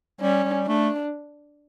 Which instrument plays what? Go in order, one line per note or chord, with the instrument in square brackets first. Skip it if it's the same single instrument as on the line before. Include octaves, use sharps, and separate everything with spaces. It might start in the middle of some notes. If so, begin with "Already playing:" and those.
[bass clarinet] G3 [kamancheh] C#4
[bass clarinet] G3
[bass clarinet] A3 [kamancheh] D4